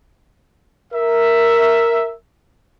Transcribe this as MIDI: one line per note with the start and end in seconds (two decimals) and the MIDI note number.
0.93 2.13 70
0.93 2.13 76